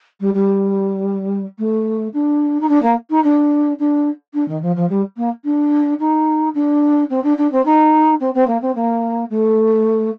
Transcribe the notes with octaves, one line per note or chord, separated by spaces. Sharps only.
G3
G3
A3
D4
D#4
D4
A#3
D#4
D4
D4
D4
D#3
F3
F3
G3
A#3
D4
D#4
D4
C4
D4
D4
C4
D#4
C4
C4
A#3
C4
A#3
A3